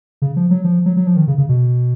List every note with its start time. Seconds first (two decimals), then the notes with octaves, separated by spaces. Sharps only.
0.22 C#3
0.36 F3
0.51 F#3
0.64 F3
0.86 F#3
0.96 F#3
1.07 F3
1.17 D#3
1.28 C#3
1.38 C#3
1.49 B2